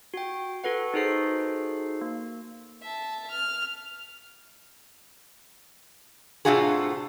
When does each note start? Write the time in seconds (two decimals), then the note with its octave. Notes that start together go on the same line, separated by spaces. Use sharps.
0.14 F#4 G5
0.64 F#4 A4 B4 F#5
0.94 D#4 F#4 G#4 A4 C5 C7
2.01 A#3
2.82 E5 A5
3.30 F6
6.45 A2 C3 D4 F4 F#4 G#4